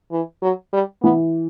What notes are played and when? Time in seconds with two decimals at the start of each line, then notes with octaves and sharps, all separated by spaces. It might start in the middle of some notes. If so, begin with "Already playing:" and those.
0.12 E3
0.42 F#3
0.73 G3
1.03 E3 B3